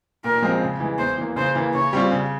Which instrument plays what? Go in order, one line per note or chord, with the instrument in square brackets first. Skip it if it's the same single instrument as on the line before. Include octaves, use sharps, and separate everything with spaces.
[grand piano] A#2 [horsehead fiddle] A#4
[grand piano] F3 G#3 C4
C#3
E3 G#3
[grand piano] E2 [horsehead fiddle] C5
[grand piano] E3 A#3
[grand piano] C#3 [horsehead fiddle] C5
[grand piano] E3 A#3
[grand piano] C#3 [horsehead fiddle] C#5
[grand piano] G3 C4 F4
C#3